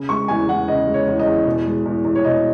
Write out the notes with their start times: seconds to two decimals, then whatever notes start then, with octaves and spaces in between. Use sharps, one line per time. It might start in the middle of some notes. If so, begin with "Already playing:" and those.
Already playing: C#3
0.09 G#3 C#6
0.28 E2 G#5
0.48 E2 F#5
0.68 C#3 D#5
0.87 G#3
0.94 C#5
1.08 E2
1.20 D#5
1.27 E2
1.46 B2
1.66 G#3
1.86 E2
2.04 E2
2.15 C#5
2.25 B2 D#5